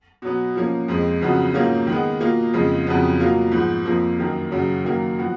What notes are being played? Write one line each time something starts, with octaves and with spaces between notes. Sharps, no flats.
B2 F#3 B3
F3 A#3 C#4
F2 F3 G#3
F2 C#3 F#3 B3 F#4
G#2 F#3 A#3 C#4 F4
D#3 G#3 B3
B2 A#3 F4
F2 C#3 G#3
F2 C#3 F#3 B3
B2 F#3 A#3 F4
G#2 F3 B3
F2 F3 A#3
F#2 D#3 A#3
F#2 C#3 F#3
F#2 D#3 F#3 A#3
F3 B3 F#4